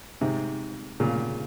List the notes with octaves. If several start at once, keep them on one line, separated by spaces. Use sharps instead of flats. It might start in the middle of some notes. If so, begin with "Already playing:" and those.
G#2 C3
A#2 C#3